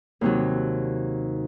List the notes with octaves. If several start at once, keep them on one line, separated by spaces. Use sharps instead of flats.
D#2 C3 F#3